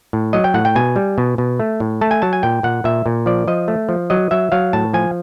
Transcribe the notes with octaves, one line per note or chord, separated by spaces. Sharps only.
A2
F#3 D#5
G5
A2 F#5
G5
B2 G#5
G3
B2
B2
A3
A2
A3 A5
G#5
F#3 A5
G#5
A#2 G5
A#2 F#5
A#2 E5
A#2
F3 D5
F3 D#5
A3
F3
F#3 D#5
F#3 E5
F#3 F5
A2 A5
F3 G#5